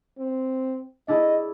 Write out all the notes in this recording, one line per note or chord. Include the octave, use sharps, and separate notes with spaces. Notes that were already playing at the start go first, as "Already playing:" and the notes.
C4
D4 E4 G#4 D#5